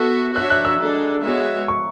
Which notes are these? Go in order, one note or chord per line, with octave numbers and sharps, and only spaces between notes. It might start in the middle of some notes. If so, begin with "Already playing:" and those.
Already playing: B3 F#4 A4 E5
D4 F#4 C#5 E5 F#6
F#6
E6
G#3 D4 A4
G#3 B3 F#4 C#5 E5
C#6